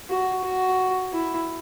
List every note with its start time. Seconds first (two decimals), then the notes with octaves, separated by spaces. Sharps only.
0.09 F#4
0.44 F#4
1.13 E4